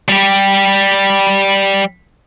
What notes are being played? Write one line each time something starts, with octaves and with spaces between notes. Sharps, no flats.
G3 G4